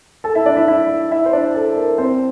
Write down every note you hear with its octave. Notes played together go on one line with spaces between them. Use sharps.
A4 A5
E4 E5
D4 D5
E4 E5
E4 E5
E4 E5
C5
D4 D5
A4
A#4
C4 C5